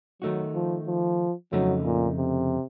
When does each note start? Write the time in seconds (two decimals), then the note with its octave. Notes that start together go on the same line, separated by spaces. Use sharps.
0.22 D#3 F#3 A3 D#4 F#4
0.54 F3
0.87 F3
1.52 F2 C#3 F#3 A3 D#4
1.85 A#2
2.18 C3